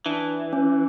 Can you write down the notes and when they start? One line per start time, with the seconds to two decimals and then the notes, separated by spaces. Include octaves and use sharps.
0.06 E3 D4
0.53 C#4